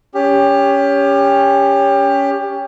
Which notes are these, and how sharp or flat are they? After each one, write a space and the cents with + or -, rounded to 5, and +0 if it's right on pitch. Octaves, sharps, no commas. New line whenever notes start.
C#4 +20 G4 +25